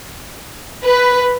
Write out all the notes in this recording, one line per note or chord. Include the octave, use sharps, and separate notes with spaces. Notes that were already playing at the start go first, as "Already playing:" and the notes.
B4